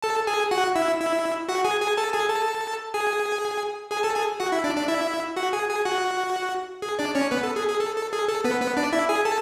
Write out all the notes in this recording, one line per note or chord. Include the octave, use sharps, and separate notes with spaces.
A4 A5
G#4 G#5
F#4 F#5
E4 E5
E4 E5
F#4 F#5
G#4 G#5
G#4 G#5
A4 A5
G#4 G#5
A4 A5
G#4 G#5
G#4 G#5
A4 A5
G#4 G#5
F#4 F#5
E4 E5
D4 D5
D4 D5
E4 E5
F#4 F#5
G#4 G#5
G#4 G#5
F#4 F#5
G#4
D4 D5
C#4 C#5
B3 B4
A4
G#4
G#4
A4
A4
G#4
A4
B3 B4
B3 B4
D4 D5
E4 E5
G#4 G#5
A4 A5